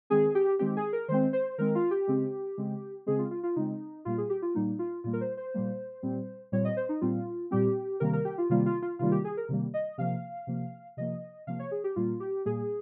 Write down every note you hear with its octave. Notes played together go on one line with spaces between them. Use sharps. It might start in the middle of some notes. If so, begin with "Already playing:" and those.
D#3 G#3 C4 G#4
G4
D#3 G#3 C4 G4
G#4
A#4
D#3 G#3 C4 C5
C5
D#3 G#3 C4 A#4
F4
G4
C#3 G#3 C4
C#3 G#3 C4
C#3 G#3 C4 G#4
F4
F4
F4
C#3 G#3 C4 D#4
A#2 G3 A#3 F4
G#4
G4
F4
A#2 G3 A#3 D#4
F4
A#2 G3 A#3 F4
A#4
C5
C5
A#2 G3 A#3
A#2 G3 C4
A#2 G3 C4 C#5
D#5
C5
D#4
A#2 G3 C4 F4
A#2 G3 C4 G4
C3 D#3 G3 A#3 A#4
A#4
G4
F4
C3 D#3 G3 A#3 F4
F4
F4
C3 D#3 G3 A#3 F4
G4
G#4
A#4
C3 D#3 G3 A#3
D#5
C3 F3 A#3 F5
C3 F3 A#3
C3 F3 A#3 D#5
C3 F3 A#3 F5
C#5
G#4
G4
A#2 G3 A#3 F4
G4
A#2 G3 A#3 G#4